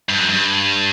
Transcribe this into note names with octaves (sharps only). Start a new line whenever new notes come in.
G2
F#2
G2